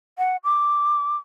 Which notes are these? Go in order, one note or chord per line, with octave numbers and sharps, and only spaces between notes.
F#5
D6